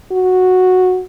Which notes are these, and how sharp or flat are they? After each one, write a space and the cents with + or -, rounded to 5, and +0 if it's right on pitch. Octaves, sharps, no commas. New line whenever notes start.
F#4 -5